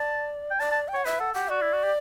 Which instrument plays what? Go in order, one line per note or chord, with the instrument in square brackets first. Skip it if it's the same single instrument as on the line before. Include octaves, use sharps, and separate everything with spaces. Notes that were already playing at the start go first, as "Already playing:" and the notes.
Already playing: [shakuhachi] D5 [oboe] A5
[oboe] G5
[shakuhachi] D5 [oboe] A5
[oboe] A5
[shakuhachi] G5
[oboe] C#5 [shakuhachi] F#5
[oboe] B4 [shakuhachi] E5
[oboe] A4 [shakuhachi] F#5
[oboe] G4 [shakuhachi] F#5
[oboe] F#4 [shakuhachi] D5
[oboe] E4
F#4
G4